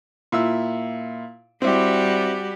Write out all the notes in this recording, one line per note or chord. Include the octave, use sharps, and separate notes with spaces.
A#2 E4 E6
G3 C4 E4 F#4 G4